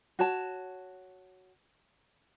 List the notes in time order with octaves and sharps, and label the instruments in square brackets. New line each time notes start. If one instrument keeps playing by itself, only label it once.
[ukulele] F#4 C#5 A5